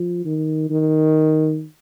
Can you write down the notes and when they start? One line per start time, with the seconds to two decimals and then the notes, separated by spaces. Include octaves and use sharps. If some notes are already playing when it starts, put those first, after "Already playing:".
Already playing: F3
0.25 D#3
0.70 D#3